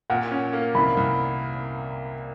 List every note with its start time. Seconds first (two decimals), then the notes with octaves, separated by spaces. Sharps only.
0.10 A#2 F#5
0.32 C#4
0.53 A#3
0.75 C2 B5
0.97 C2